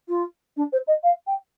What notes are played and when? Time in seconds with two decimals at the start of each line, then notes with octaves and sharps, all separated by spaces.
0.08 F4
0.56 D4
0.72 C5
0.87 D#5
1.03 F5
1.27 G5